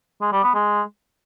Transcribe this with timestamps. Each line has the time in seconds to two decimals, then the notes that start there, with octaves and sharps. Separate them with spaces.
0.21 G#3
0.32 G3
0.43 B3
0.54 G#3